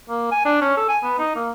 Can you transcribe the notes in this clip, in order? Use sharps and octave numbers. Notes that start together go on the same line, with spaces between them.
A#3
G#5
D4
C#4
A4
G#5
B3
D#4
A#3